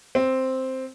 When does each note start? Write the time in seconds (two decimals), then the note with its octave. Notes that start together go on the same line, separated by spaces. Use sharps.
0.15 C4